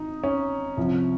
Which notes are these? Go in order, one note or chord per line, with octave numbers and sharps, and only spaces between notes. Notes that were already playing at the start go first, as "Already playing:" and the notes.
Already playing: G#1 D#4
C#4
C2 C3 F3